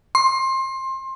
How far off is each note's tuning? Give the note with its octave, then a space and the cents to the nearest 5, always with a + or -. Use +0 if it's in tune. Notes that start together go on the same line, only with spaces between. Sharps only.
C6 +25